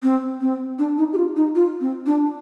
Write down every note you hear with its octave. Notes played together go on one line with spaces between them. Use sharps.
C4
C4
D4
D#4
G4
F4
D#4
F4
C4
D4